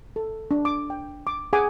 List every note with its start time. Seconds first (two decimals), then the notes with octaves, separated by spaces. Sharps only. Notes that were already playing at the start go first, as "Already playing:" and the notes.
0.16 A4
0.51 D4
0.65 D6
0.90 G5
1.27 D6
1.53 G#4 F#5 G#5 D6